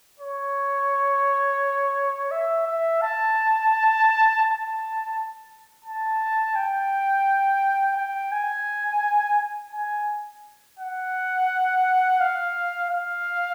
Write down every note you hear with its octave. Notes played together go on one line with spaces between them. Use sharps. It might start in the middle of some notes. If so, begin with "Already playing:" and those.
C#5
E5
E5
A5
A5
A5
G5
G5
G#5
G#5
F#5
F5
F5